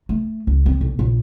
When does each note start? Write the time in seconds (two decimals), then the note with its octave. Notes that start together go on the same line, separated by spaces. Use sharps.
0.09 A3
0.47 C#2
0.66 C4
0.81 B1
0.99 A#1